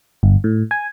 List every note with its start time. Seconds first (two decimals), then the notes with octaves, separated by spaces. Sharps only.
0.23 G1
0.44 A2
0.71 G#5